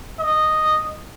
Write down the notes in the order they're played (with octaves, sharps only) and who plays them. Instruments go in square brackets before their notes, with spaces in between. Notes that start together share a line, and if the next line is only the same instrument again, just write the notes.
[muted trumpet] D#5